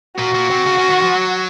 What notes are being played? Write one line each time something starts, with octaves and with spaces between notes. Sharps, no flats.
A#2 F#4
A#2
C3
C#3
C#3
D#3
F3
F#3